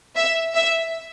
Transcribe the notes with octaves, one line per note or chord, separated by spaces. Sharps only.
E5
E5